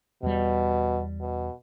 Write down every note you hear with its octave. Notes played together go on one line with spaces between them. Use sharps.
E2 B2 G3
B2